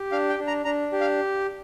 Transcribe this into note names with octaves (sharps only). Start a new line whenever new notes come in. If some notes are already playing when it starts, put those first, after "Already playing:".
Already playing: G4
D4 F5
G5
D4
A#5
D4 A#5
G4
F5